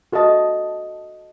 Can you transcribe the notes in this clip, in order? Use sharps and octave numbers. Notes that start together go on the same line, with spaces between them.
F#4 A4 D#5 A5